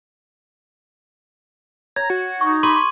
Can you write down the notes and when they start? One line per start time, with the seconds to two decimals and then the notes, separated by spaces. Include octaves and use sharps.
1.96 C#5 A#5 G#6
2.10 F#4
2.41 D#4 C#6
2.63 G4 B5 C6 D6 D#7
2.76 C#6